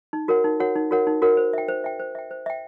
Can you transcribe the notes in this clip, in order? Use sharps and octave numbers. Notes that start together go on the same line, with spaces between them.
D#4
F#4 A#4 C#5 F#5
D#4
F#4 A#4 C#5 F#5
D#4
F#4 A#4 C#5 F#5
D#4
F#4 A#4 C#5 F#5
C5
E5 G5
C5
E5 G5
C5
E5 G5
C5
E5 G5